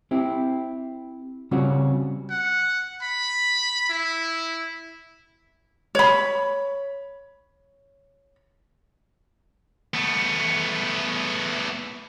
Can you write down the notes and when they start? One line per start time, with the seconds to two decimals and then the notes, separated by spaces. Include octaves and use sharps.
0.11 C4 E4 G4
1.51 C#3 G3 C4 C#4 F4 F#4
2.30 F#5
3.02 B5
3.89 E4
5.95 C#5 B5
9.94 A3 B3